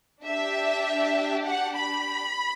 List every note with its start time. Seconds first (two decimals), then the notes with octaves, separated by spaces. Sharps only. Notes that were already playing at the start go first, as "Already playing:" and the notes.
0.25 D4 G4 E5
1.47 F#5
1.78 B5